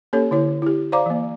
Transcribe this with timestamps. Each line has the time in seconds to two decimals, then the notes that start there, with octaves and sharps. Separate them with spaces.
0.13 A#3 C#4 G4 A4 C#5
0.31 D3 E4 C#5
0.62 E4 G4
0.92 C5 D5 F5 A#5 D6
1.06 E3 A#3